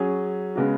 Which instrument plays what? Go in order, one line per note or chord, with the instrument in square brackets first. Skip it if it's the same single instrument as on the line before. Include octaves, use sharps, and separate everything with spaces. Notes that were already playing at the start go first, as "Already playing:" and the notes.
Already playing: [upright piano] F#3 C#4 G#4
C#3 G#3 B3 F#4